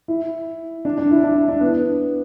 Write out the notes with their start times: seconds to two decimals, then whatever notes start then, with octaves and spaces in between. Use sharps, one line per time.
0.08 E4
0.85 D4
0.98 D4
1.11 E4
1.23 D4
1.36 E4
1.48 D4
1.61 B3